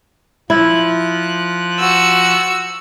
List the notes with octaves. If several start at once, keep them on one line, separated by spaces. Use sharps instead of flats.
F3 E4 F#6
F#4 E6